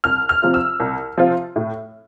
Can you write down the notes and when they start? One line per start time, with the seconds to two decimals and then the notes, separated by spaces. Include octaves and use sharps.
0.04 C2 F6
0.29 F6
0.42 C3 F3 C4 F4
0.54 E6
0.80 C2
1.18 C3 F3 C4 F4
1.56 A2